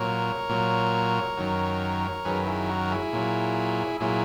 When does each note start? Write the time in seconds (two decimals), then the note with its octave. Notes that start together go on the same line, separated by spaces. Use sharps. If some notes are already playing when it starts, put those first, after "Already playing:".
Already playing: A#2 F#3 A#4 C#5
0.49 A#2 F#3
1.37 F#2 D#3 F#3
2.25 F#2 D#3 F#3 G#4 B4
2.46 E4 G#4
2.69 F#4 A#4
2.90 E4 G#4
3.13 A#2 F#3
4.00 A#2 F#3 E4 G#4